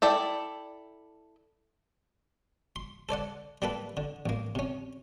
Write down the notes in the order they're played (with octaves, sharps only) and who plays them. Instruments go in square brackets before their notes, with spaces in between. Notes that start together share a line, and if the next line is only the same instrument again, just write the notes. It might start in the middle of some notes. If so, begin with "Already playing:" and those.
[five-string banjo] E4 A4 D5 G5
[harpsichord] C6
A4 C5 D5 F#5
G3 A#3 A4 B4
D3
A1 A#3
C3 C#4